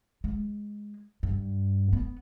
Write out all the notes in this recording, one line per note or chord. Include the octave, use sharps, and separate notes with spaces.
G#3
G2
B3